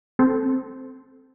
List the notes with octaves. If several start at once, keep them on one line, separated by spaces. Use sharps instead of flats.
C4 A4 C5